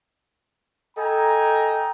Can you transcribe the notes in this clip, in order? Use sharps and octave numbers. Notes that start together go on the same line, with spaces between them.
A4 D#5 G5 G#5 A#5